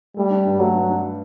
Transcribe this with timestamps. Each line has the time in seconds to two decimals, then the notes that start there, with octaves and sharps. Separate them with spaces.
0.17 G3 A3
0.30 D4
0.46 G2
0.59 F#3 A3
0.74 G2
0.89 D4